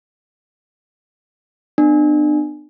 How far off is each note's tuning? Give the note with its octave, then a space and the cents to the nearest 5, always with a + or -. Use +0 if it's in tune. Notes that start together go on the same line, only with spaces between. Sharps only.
B3 +15 D4 +35